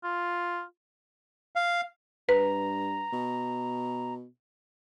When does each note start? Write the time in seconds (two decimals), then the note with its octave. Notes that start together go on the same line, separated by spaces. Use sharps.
0.03 F4
1.56 F5
2.29 G2 B4 A#5
3.12 B2